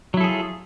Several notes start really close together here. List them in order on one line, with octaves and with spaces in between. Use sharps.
F#3 E4 A4 G#4 F4